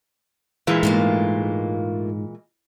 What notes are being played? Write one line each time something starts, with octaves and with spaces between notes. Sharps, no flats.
A#2 E3 G#3
G#2 A3 A#3 F4